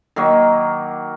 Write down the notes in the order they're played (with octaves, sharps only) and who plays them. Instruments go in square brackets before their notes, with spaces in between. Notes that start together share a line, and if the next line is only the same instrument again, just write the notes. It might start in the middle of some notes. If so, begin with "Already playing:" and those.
[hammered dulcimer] D#3 F#3 A#3